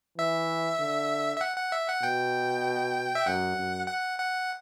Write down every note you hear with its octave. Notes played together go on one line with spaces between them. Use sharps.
E3 E5
D3
E5
F#5
F#5
E5
F#5
B2 G5
E5
F#2 F#5
F#2
F#5
F#5